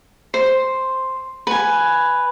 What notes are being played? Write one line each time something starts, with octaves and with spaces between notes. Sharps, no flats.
C5
B4 G#5